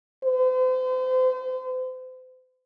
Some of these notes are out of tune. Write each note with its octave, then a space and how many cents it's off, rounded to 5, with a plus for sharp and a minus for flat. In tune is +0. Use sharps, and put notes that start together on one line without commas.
C5 -40